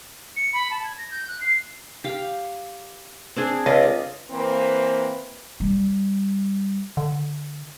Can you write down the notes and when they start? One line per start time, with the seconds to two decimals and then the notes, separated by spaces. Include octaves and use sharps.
0.36 C#7
0.53 B5
0.71 A5
0.84 G#6
0.98 A#6
1.11 G6
1.28 F#6
1.41 C7
2.04 G4 F5
3.36 C4 D4 G#4
3.66 C#2 F4 D5 D#5
4.30 E3 A#3 C4 B4 C5
5.60 G3
6.97 D3